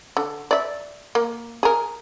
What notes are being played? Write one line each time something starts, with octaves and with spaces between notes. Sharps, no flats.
D3
D5 E5
A#3
G#4 A#4